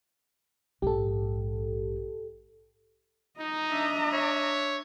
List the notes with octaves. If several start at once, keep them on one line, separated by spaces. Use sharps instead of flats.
A#1 G#2 G4 A4
D#4 D#5 A#5
D4 E5
C#5